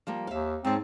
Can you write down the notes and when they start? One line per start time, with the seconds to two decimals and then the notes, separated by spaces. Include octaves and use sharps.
0.07 F3 G3 A#3
0.27 D#2 E5 F5
0.65 G#2 C4 C#5 A5